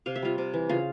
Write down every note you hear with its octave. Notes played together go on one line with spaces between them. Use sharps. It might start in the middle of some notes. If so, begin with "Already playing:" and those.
C3 F5
E5
G3 F4 F5
C3
E3
C#3 F4 F5